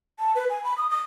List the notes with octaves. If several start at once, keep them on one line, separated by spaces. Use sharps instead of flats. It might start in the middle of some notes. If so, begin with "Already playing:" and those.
A5
B4
G#5
B5
D#6
D#6